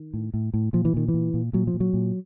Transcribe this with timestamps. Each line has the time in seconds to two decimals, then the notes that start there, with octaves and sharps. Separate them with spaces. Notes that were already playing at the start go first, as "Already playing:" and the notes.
Already playing: D#3
0.14 A2
0.34 A2
0.54 A2
0.73 A#2 F3
0.85 E3
0.94 A#2 D#3
1.08 E3
1.14 A#2
1.34 A#2
1.53 A#2 F#3
1.67 F3
1.74 A#2
1.80 F#3
1.94 A#2